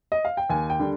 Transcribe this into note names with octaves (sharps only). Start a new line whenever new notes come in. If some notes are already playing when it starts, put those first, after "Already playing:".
D#5
F5
G5
D#2 G#5
G5
D3 G3